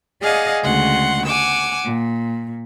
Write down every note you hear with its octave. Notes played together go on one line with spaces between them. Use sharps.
G#4 D5 D#5 F5 F#5 G#5
D2 C#3 G#3 F#5 C6
F#5 G#5 D6 E6
A#2